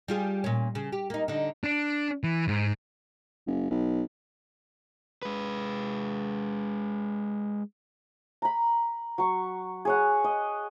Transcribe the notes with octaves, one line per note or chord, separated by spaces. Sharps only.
G3 F4 G#4
A#2 C#4
C#3
G4
A#3 D#4
D3 D#4
D4
E3
G#2
F#1
B1
G#3 B4
A#5 B5
F#3 C#6
G#4 C#5 F#5
D#5